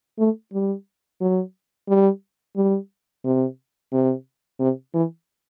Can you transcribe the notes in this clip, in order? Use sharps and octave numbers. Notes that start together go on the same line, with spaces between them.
A3
G3
F#3
G3
G3
C3
C3
C3
E3